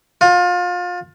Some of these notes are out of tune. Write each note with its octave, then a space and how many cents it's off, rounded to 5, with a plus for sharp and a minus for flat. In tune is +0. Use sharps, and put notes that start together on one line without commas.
F4 +30